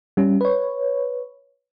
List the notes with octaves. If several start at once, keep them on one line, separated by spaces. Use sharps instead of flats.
G3 C#4
B4 C#5